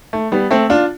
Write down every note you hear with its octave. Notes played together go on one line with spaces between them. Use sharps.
A3
G3 B3
A3 C4
D4 F4